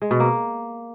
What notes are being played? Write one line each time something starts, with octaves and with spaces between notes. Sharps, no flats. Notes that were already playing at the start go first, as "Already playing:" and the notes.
G#3
B2
A#3